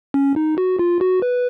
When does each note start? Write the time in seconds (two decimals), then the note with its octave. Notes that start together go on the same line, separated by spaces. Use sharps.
0.14 C#4
0.36 D#4
0.58 F#4
0.79 F4
1.01 F#4
1.22 B4